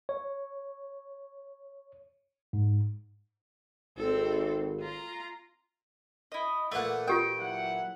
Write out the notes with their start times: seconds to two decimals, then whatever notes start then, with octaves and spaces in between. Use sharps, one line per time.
0.09 C#5
2.53 G#2
3.98 G#1 C4 A4
4.80 F4 A#5
6.32 E4 D#5
6.72 A#2 E3 A3 D4 F#5
7.08 F4 G4 A#4 G5
7.39 F#3 E4 F#5